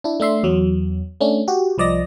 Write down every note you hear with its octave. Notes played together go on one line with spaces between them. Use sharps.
D4 E4
A3 D4 E5 C6
E2 F#3
A3 C#4 D4
F#4 G4
C2 F3 D5 D#5 A#6